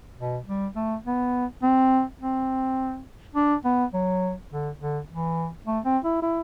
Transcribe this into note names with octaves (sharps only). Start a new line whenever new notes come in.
B2
G3
A3
B3
C4
C4
D4
B3
F#3
D3
D3
E3
A3
C4
E4
E4